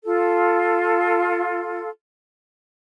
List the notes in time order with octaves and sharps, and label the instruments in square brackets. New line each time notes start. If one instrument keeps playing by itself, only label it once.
[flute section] F4 A4